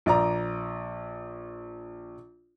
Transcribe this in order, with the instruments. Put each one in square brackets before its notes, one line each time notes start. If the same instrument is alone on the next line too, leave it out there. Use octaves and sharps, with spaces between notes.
[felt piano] A#1 D5 A#5